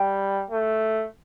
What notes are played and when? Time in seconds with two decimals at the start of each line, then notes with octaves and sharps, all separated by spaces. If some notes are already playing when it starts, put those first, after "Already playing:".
Already playing: G3 G5
0.50 A3